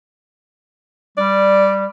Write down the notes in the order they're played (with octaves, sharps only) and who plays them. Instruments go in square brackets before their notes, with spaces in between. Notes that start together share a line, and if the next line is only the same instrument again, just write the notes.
[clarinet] G3 [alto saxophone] D5